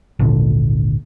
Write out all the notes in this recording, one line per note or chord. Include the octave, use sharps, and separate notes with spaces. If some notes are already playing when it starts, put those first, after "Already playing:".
G#1 D2 A#2 D3